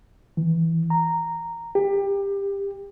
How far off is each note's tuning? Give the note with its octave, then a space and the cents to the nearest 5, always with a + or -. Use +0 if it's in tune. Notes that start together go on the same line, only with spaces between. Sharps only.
E3 -10
A#5 -10
G4 +20